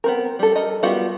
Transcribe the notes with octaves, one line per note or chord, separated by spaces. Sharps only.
B3 C4 A#4
G3 A4
A4 A#4 D#5
G3 B3 F4 F#4 F#5